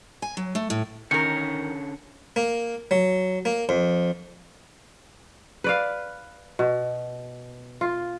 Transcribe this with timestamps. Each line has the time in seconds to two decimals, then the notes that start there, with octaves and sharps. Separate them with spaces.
0.22 G#5
0.37 F#3
0.55 A3
0.70 A2
1.11 D3 D#3 C#4 A#4 C#5 C#7
2.36 A#3
2.91 F#3
3.45 A#3
3.69 F2
5.64 B4 D5 F5
6.59 B2
7.81 F4